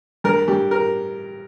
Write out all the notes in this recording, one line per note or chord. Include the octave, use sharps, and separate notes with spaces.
G2 A#4
G2 G4
A#4